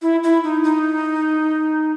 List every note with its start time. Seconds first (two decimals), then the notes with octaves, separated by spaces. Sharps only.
0.02 E4
0.24 E4
0.44 D#4
0.64 D#4